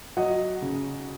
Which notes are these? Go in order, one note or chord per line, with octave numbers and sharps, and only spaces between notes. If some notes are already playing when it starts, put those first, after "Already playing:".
F#3 D#5 F#5
C#3